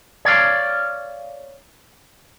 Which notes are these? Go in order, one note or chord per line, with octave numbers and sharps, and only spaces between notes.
C#5 D5 F5